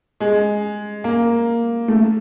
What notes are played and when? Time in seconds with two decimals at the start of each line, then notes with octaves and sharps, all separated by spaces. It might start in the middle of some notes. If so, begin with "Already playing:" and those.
0.20 G#3
1.04 A#3
1.88 A3